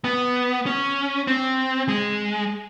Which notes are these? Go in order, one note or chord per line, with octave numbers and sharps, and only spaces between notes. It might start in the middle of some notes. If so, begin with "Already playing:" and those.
B3
C#4
C4
G#3